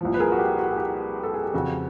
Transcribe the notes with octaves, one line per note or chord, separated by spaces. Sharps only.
C2 A#2 F3
B4
G#4 A#4
F#4
G4
F#4
G#4
G4
A4
G#4
G4
F2 C#3 F3 F#4